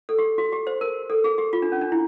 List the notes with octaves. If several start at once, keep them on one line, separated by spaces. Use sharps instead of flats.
A4
G4
F#4
G4
C5
A#4
A4
G#4
G4
F4
D4
C#4
D4
E4